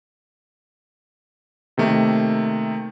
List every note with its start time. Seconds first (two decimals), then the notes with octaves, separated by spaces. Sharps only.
1.78 C3 D#3 A3 A#3